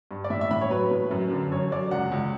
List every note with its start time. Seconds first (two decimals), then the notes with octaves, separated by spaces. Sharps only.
0.11 G2
0.24 D5
0.30 A2 E5
0.41 E5
0.51 A2 B5
0.61 C#5
0.71 F#3 B4
0.91 A2
1.11 F#2
1.32 D3
1.52 F#2 C#5
1.72 F#2 D5
1.91 C#2 F#5
2.12 C#2